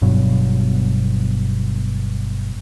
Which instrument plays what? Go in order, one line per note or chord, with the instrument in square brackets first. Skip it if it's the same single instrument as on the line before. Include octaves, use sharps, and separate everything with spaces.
[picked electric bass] G1 G2 B2 F#3